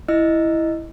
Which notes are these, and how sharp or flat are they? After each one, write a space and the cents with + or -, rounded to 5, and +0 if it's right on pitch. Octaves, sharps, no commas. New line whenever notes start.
E4 +0 D#5 +0 E6 +15